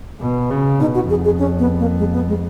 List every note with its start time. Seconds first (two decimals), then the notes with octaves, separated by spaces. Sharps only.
0.21 B2
0.50 C#3
0.80 B2 D#4
0.95 F#4
1.09 F2 G#4
1.25 G#4
1.39 C#4
1.59 B3
1.79 A#3
1.99 G#3
2.13 B3
2.28 G#3